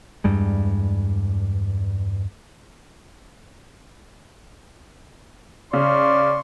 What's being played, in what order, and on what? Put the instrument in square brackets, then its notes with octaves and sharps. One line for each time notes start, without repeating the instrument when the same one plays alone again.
[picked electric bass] E2 G2 G3 G#3
[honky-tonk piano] C#3 [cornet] D5 [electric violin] C6 C#6